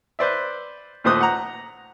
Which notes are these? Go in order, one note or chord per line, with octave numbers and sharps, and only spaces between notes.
B4 C5 D5 E5
D#2 A#2 A3 C5 D#6 F#6
F#5 A#5